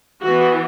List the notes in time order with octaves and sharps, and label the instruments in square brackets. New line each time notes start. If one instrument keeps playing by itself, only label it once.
[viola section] E3 B3 F#4